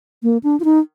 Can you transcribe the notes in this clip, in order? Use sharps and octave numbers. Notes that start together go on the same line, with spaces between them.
A#3
D4
F4
D#4